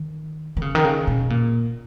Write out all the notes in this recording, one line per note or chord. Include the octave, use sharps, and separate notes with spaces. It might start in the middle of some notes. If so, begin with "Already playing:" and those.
Already playing: D#3
D#3
C#3
D#3
C#3
B2
A#2